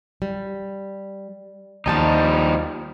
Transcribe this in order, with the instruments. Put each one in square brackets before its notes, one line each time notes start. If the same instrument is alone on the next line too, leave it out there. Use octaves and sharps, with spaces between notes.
[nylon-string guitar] G3
[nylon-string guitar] D#2 G#5 A5 [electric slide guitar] F3 G3 D#4